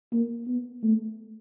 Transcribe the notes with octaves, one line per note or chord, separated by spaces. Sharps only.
A#3
B3
A3